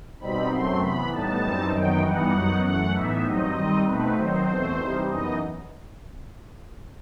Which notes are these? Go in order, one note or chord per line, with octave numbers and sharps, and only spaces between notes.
B2 G3 C4 D#4 B5
F#2 F#3 A3 C4 C6
C3 E3 B3 B5
A2 G3 B3 D#4 A5
F#2 E3 G3 C4 D#4
F#2 D#3 F#3 B3 D#4 G5
G2 E3 G3 B3 D#4 F#5
F#2 F#3 B3 D#4
F#2 E3 A3 F#5
A2 E3 B3 D#4 E5
G2 F#3 C4 D#4 D#5
D#3 G3 C4 D#4
B2 A3 C4 D#4 B4
D#3 F#3 C4 D#4 C5
E2 B2 A3 C4
C3 E3 G3 D#4
F#2 E3 B3 D#4 D#5